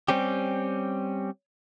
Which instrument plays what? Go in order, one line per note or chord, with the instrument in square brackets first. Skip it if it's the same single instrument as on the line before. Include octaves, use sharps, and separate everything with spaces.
[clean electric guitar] G3 C4 C#4 G4